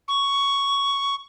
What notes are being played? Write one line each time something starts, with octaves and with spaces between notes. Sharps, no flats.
C#6